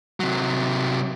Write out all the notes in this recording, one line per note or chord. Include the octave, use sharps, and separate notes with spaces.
C3 F#3